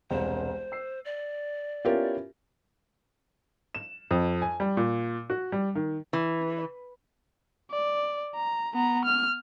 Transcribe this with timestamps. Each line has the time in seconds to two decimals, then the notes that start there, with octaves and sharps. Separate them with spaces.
0.10 E1 C2 C5
0.72 E6 C7
1.05 D5
1.85 B3 C#4 E4 F4 G4 A#4
3.75 E7
4.11 F2
4.42 G#5
4.60 G3
4.77 A#2
5.30 F#4
5.52 G3
5.75 D#3
6.13 E3
7.70 D5
8.35 A#5
8.74 B3 A#5
9.05 F6